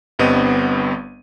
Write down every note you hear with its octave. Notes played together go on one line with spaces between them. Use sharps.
G1 G2 B3 C4 D#5 D#7